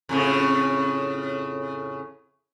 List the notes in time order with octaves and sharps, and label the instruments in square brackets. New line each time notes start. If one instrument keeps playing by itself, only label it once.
[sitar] F2 A2 C#3